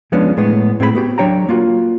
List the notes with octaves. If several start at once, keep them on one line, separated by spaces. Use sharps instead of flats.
F3 G#3 B3 C#4 D4
A2 G#3 B3
A2 C4 G#4 B4 B5
B3 F#4 G4
F#3 D4 C#5 G5 A#5
A#3 F4 F#4